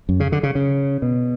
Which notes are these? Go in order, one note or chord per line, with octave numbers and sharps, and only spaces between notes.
F#2
C#3
D3
C#3
C#3
B2